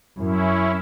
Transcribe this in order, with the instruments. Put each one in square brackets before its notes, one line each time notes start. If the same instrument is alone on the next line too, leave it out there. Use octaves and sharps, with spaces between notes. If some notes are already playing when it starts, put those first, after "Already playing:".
[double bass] F#2 [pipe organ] C#4 E4